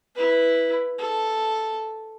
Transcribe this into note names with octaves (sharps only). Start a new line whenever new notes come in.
E4 B4
A4